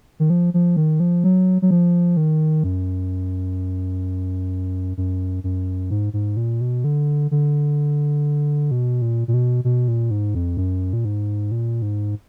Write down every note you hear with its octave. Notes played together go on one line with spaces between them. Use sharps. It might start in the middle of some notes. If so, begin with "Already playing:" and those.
D#3
F3
F3
D#3
F3
F#3
F#3
F3
D#3
F#2
F#2
F#2
G#2
G#2
A#2
B2
D3
D3
B2
A#2
A#2
B2
B2
A#2
G#2
F2
F#2
A#2
G#2
A#2
G#2